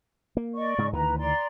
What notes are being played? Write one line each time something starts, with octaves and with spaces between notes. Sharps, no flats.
A#3
D5 D#5 C#6
G#2 C#3 G#3
D2 D#3 E3 B4 A#5
D5 A#5 C6